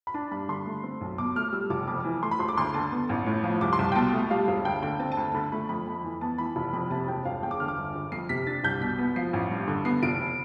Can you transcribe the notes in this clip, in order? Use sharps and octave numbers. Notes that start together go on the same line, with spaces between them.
B5
D4 A5
G2 B5
D3 C6
A3
C4
B1
B2 D6
A3 F6
G3 E6
F1 D6
F2 D6
E3
A3 C6
B5
E1 C6
D6
D2 C6
D3 A5
B3
A1
A2
F3
C2 D6
C6
C2 A5
G5
B2 A5
A3
G3 F5
E1 F5
D2 G5
D3 G5
C4 A5
A5
D2
A5
D3 B5
A3 B5
F2 B5
F2
E3
B3 A5
E3 B5
F1
F2 B5
C3 A5
E1 G5
E1 F5
E2 G5
D6
D3 F6
D6
G1
G1
F2 C7
C3 B6
D4 A6
C2 G6
B2 B6
B3
F3 C7
A1
G2
D3
B3 C7
F1 D7